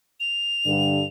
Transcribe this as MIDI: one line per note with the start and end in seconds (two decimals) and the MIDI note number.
0.20 1.07 101
0.66 1.03 43
0.66 1.03 50